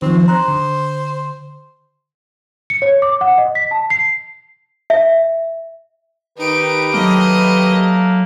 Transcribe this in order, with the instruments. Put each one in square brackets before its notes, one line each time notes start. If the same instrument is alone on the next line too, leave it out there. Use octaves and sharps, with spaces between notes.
[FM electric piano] D#3 F3 [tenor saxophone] C4
[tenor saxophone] C5 [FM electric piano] A#5 F#6
[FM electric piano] D3
[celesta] C#7
C#5
D6
F#5
D#5
B6
A5
C7
[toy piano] E5
[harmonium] D#3 G4 B4 [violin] D#4 D7
[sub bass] F#3 [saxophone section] A3 A#3 [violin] D#5